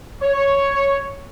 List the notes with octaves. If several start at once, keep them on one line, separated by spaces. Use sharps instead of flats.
C#5